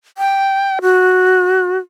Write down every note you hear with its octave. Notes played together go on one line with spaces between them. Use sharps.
G5
F#4